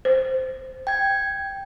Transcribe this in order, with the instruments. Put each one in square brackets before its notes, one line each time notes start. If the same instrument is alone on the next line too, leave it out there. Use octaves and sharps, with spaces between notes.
[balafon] C5
[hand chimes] G5 G#6